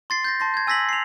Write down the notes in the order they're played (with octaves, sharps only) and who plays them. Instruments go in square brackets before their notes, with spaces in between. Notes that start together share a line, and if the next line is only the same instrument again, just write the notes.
[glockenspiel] C6 A6 C7
G6 A6 A#6
A5 C6 A#6
G6 G#6
G#5 E6 G#6 A#6 B6 F#7
C7 F7